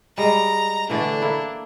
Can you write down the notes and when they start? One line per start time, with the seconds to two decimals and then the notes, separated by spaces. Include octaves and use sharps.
0.18 G3 G#3 D#5 A#5
0.90 D3 E3 A3 D4
1.22 A#3 E4